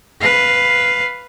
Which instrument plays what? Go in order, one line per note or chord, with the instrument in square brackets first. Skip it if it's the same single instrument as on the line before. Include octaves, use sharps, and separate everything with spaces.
[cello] B4 F5